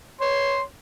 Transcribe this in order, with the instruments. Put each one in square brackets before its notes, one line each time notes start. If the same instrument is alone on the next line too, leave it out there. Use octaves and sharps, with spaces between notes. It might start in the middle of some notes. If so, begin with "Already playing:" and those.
[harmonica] C#5 C6